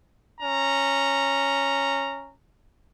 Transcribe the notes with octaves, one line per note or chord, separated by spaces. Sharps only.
C#4 A#5